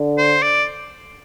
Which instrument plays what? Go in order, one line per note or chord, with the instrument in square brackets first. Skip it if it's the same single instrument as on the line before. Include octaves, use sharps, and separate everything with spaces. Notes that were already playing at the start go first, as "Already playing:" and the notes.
Already playing: [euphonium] D3
[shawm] C5
D5